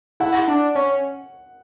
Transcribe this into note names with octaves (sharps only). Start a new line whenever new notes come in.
E4 F#5
D4
C#4